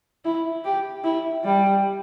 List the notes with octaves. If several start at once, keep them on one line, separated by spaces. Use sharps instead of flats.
E4
G4
E4
G3